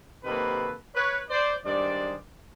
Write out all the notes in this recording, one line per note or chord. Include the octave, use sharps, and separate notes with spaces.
C3 D#3 F#3 A#3 A4 B4
B4 C#5
C5 D5
G2 D#3 G#3 C5 D5